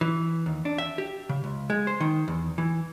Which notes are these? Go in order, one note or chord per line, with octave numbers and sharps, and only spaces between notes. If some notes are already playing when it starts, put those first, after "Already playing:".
E3
D#2
D4
E5
G4
C#3
C#2
G#3
C5
D#3
E2
E3